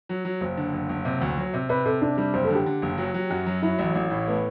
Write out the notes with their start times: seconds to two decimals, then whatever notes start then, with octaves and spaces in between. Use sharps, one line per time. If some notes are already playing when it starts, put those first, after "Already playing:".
0.09 F#3
0.25 F#3
0.41 F#1 C5
0.57 D3
0.73 F#1
0.89 F#1
1.05 C3
1.21 D2
1.38 F#3
1.53 C3
1.69 C3 B4
1.85 C3 A4
2.02 C3 D4
2.18 G3 D4
2.34 F#1 C5
2.45 A4
2.50 D3
2.55 G4
2.66 D3
2.82 F#1
2.98 F#3
3.14 F#3
3.30 F#2 F#4
3.46 F#3
3.62 F#3 E4
3.79 A1
3.95 A1
4.10 A2
4.27 A3 B3